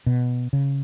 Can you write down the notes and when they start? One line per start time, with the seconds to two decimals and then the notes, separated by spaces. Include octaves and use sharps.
0.06 B2
0.53 C#3